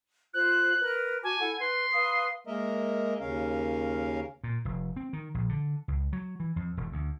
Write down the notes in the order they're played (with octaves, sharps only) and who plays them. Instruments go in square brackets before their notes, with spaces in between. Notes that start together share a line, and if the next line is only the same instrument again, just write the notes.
[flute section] F4 C5 [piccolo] F#6
[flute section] A#4 B4
[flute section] F#4 A5 D6 [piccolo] G#5
[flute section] E4 A4 F#5
[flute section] B4 [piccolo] C6
[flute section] B4 F5 D#6
[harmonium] G#3 A#3 A#4 D#5 E5
D#2 C#3 C#4 A#4 F5
[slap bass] A#2
F1
C4
D#3
A#1
D3
C#2
F#3
E3
F2
E1
D2